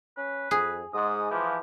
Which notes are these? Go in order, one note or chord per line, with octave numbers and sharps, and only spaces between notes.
C#4 B4
F2 G#4
G#2 G#3 D#6
E3 F3 G4